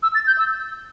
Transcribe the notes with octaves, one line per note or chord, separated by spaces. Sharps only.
E6
A6
G6
E6